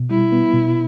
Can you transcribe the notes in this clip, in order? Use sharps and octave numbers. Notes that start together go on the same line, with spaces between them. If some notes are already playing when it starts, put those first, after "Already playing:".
Already playing: B2
G3 E4
B3
B2